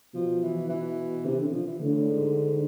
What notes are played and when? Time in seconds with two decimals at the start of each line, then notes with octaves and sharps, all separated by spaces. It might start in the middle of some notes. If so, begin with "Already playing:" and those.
0.14 B2 F3
0.43 E3
0.69 E3
1.25 C3
1.39 D3
1.52 F3
1.67 E3
1.81 A2 D3
2.08 G#2